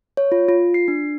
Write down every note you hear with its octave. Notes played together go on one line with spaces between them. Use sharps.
C#5
F4
F4
C7
D4